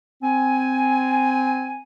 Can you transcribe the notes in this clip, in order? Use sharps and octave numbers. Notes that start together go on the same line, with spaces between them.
C4 G#5